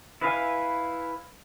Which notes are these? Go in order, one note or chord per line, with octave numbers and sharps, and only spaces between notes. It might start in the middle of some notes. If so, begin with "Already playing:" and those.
E4 B4 E5 F5 G#5